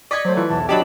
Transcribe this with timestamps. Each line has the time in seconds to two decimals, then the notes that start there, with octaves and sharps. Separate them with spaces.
0.11 D5 D#5 G#6 B6 C#7
0.25 F#3 A3 C5
0.37 E3 F4
0.49 B1 E2 A5
0.69 F#3 D4 G4 D#5 A5 B5